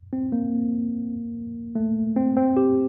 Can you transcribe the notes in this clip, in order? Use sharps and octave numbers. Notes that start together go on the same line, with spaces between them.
C4
A#3
A3
C4
C4
G4